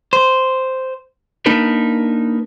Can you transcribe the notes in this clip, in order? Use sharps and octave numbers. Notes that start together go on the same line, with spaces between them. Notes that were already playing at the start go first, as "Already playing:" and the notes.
C5
A#3 D4 D#4 A#4 B4